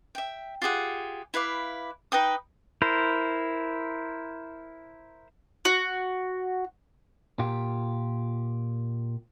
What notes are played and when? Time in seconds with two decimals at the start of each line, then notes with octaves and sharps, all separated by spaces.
0.15 E5 G5
0.62 F4 G4 G#4 F#5
1.34 E4 B4 F5 D6
2.12 D#4 B4 G5 D#6
2.82 E4 A#4 C5
5.65 F#4
7.39 A#2 F4 G4